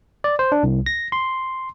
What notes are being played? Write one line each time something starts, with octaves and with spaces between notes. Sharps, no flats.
D5
C5
D4
C2
A#6
C6